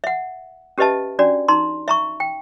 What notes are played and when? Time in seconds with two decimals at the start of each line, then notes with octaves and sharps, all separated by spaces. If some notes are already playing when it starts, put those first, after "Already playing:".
0.04 E5 F#5
0.78 C#4 G4 B4 D#5 E5 A5
1.19 C#4 D4 F#4 D5
1.48 D#4 A#5 C6
1.88 E5 A#5 C#6
2.20 G5